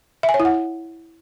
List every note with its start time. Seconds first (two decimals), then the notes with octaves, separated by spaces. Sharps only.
0.23 E5
0.29 G#5
0.34 C#5
0.40 E4
0.45 F#5